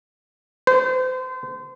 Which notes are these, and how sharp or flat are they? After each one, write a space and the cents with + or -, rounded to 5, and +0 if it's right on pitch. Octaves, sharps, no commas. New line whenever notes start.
C5 -30